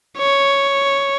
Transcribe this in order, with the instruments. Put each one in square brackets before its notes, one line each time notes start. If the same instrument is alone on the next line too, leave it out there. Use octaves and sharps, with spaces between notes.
[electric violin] C#5